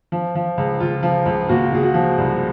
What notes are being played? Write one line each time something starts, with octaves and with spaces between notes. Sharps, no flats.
F3
F3
C#2
C#2 F4
F3
C#2
A#2 F#4
A#2 G#4
F#4
F3
C2